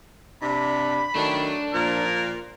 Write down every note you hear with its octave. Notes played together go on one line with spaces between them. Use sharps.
C3 D4 B5
D#3 F#3 A3 D4
A#2 F3 A#4